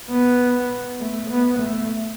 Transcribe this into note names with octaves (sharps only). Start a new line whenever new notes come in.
B3
A3
B3
A3